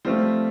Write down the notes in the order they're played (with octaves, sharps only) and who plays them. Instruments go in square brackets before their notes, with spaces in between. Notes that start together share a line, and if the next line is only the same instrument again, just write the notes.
[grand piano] F3 A3 F4 [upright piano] G3 C4